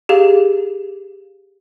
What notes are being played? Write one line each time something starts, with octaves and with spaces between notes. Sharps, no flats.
G4 G#4 F5